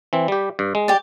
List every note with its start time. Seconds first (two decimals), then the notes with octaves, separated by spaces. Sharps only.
0.13 E3 C4
0.28 G3 G4
0.59 G2
0.75 G#3
0.88 G4 D5